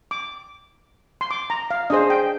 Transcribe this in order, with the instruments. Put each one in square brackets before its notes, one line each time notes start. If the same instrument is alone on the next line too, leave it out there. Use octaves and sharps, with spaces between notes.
[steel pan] D6
C6
D6
A#5
F5
D4 G#4 C5 D#5
G5